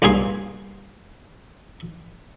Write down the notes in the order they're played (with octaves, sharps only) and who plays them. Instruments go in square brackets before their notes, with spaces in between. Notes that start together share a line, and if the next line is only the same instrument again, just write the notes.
[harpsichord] B1 G2 A#3 G#4 C6